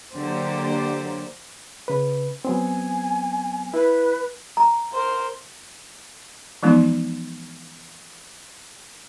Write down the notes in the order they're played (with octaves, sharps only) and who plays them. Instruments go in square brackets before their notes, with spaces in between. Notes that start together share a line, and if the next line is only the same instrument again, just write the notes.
[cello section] D3 F#3 A#3 [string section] G4 C5
[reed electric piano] C#3 B4
[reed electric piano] F#3 B3 C4 [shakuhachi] G#5
[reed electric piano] E4 [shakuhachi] B4
[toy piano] A#5
[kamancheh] A#4 C5
[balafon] E3 F3 G#3 B3 C#4 D#4